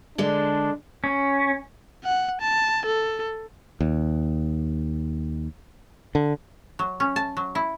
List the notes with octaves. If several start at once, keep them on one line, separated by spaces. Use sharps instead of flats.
D3 G#3 D4
C#4
F#5
A5
A4
D#2
D3
F#3
C#4
A5
F#3
E4